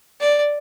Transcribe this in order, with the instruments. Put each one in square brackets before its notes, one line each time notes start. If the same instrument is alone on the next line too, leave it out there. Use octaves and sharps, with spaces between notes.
[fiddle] D5